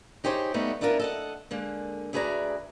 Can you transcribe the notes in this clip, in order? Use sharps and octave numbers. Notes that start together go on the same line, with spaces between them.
D#4 G4 G#4 C5 C#5
G3 A3 B3 D#4
B3 D4 E4 F4 A#4
A4 D#5 F#5
D3 G#3 A#3
D2 A3 G#4 B4 D5 A#5